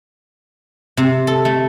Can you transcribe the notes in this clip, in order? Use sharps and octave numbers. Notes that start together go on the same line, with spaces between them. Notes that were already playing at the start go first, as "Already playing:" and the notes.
C3
A4
A3